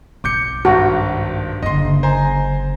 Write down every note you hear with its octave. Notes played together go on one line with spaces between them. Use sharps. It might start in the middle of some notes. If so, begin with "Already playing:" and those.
B1 D6 G6 C#7
G#1 G2 F#4
F#1 D3 D#5 C6
C5 G#5 A#5